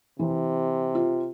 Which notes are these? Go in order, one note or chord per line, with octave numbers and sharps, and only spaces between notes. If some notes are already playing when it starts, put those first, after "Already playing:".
C3 E3
F4